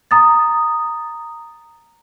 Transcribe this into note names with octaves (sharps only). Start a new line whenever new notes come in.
A#5 D#6 A6